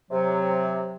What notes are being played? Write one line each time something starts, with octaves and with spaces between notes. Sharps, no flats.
C3 F#3